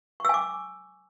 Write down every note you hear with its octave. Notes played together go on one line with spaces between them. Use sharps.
G#5 C#6 D6 E6